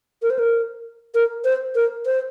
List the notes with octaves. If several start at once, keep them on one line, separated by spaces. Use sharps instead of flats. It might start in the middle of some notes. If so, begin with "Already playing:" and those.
A#4
C5
A#4
A#4
C5
A#4
C5